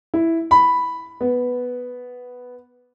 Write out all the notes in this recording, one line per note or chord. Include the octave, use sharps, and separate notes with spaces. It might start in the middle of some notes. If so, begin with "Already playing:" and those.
E4
B5
B3